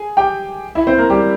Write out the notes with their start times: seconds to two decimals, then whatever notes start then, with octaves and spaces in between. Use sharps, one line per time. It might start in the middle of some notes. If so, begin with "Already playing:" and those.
Already playing: G#4 G#5
0.17 G4 G5
0.75 E4 E5
0.87 C4 C5
0.98 A#3 A#4
1.10 G3 G4